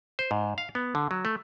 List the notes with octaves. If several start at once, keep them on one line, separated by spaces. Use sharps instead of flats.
C5
G#2
F5
B3
D3
F#3
A3